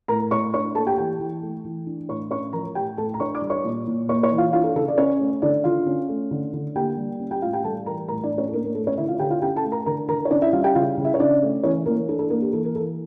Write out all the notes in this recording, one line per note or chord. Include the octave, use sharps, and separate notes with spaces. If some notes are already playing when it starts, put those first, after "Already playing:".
A2 A#4 A#5
A2 C#5 C#6
D4 C#5 C#6
A#3 A4 A5
G4 G5
E3 G4 G5
E3
A3
E3
D4
A2 C#5 C#6
C#4 C#5 C#6
F3 A#4 A#5
A2 G4 G5
A2 A4 A5
A#5
D4 C#5 C#6
D5 D6
G3
C#5 C#6
A#2
A#2
A#3 C#5 C#6
C#5 C#6
E3
F4 F5
D4 F4 F5
A4
C#3 A4
D5
C#4 C#5
A3
D3 D4 D5
D3 F4 F5
C#4
A3
D3
D3
A#3 G4 G5
G3
C#4
G4 G5
A2 F4 F5
G4 G5
G3 A4 A5
E3 A#4 A#5
A2 A#4 A#5
D4 D5
A2
C#4 C#5
A4
A#3 D4 A#4
A#3 A#4
A3 A4
C#4 C#5
D3 E4 E5
F4 F5
D3 G4 G5
F4 F5
C#4 G4 G5
A4 A5
A3
A#4 A#5
D3 A#4 A#5
D3 A#4 A#5
C#5
C#4 D4 D5
E4 E5
G3 F4 F5
G4 G5
C#3 F4 F5
C#3
E4 E5
C#5
C#4 D4 D5
A3
E3 C#4 C#5
E3 A#3 A#4
D4 A4
A4
A#3 A#4
G4
E3 A4
A#4
E3 A4